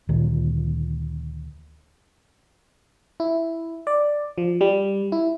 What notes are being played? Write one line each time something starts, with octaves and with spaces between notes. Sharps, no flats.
D2 A#2 D#3
E4
D5
F3
G3
E4